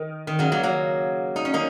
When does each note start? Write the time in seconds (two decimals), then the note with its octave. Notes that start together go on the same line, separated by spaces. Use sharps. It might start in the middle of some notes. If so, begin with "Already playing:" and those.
Already playing: D#3
0.27 D#3
0.39 C#3 F#3
0.52 F#3 A#3
0.63 F#3 A#3
1.36 D#4
1.45 C#4
1.53 A#3 D#4